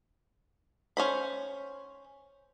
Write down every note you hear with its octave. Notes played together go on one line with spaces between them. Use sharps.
C#4 C5 B5